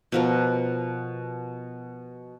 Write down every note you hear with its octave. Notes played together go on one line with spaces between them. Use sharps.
B2 F3 A#4